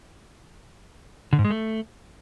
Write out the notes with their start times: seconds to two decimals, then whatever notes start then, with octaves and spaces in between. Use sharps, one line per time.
1.33 D3
1.39 G#2
1.45 G#3
1.50 A3